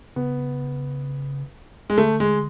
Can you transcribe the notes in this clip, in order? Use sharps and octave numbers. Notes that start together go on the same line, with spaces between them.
C#3 B3
G#3
D3 A3
G#3